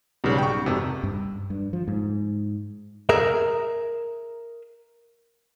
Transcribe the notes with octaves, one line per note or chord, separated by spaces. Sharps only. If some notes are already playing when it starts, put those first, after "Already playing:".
B1 G#2 C#3 G3 B3
G5 C#6
G#1 F2 C3
G2
G2
F3
G#2
G#4 A#4 E5